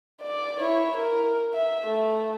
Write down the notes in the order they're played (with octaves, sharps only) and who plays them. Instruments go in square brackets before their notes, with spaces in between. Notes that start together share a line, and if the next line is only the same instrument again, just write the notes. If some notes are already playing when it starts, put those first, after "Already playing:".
[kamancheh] D5
E4 C#5
A#4
E5
A3